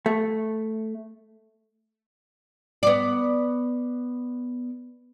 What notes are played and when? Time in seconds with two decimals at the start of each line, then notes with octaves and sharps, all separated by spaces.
0.06 A3
2.83 B3 D5